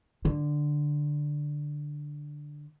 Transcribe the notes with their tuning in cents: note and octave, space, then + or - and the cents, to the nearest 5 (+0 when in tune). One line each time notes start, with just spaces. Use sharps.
D3 +5